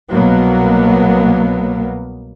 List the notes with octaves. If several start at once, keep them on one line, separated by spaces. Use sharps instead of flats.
C2 B2 F#3 A#3 B3